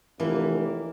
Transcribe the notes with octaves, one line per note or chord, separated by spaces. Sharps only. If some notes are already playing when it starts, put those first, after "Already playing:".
F1 E3 A#3